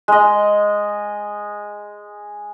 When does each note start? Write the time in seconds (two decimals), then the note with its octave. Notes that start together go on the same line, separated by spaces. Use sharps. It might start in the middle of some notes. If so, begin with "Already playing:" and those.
0.08 G#3 D#5